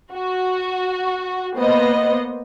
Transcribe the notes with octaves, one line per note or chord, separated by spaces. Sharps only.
F#4
A#3 B3 C5 D#5